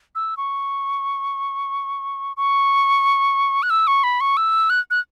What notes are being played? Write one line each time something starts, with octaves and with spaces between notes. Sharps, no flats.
E6
C#6
C#6
F#6
E6
C#6
B5
C#6
E6
F#6
F#6